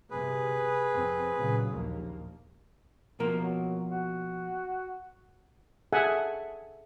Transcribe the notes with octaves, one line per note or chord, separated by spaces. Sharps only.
G1 C3 G#4 B4
F2 C4
A#2 C#3 F#3
A#1 D#2 A#3
B2 F3 A#3 A#4
F#3
F#4
G#4 A4 E5 F#5 G#5 A5